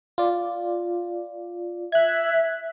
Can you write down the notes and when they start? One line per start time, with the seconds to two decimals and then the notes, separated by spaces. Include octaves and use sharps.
0.18 F4 D5
1.92 E5 F#6 G#6